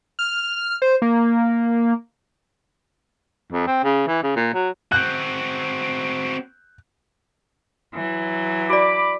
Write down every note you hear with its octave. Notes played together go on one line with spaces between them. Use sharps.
F6
C5
A#3
F2
C4
C#3
E3
C#3
A#2
F#3
C4 F#4 F#6 G6
E3 F#3
F#4 D5 B5 D6